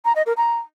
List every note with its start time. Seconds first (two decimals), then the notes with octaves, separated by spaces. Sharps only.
0.05 A#5
0.16 D#5
0.26 A#4
0.37 A#5